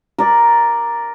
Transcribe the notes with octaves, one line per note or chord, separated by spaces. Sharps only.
A#4 D5